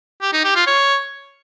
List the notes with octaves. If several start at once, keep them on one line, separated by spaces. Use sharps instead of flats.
G4
D#4
G4
F4
C#5